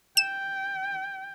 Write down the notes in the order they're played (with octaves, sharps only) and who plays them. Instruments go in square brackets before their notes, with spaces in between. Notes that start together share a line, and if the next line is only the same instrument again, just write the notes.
[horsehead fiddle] G5 [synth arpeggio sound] E7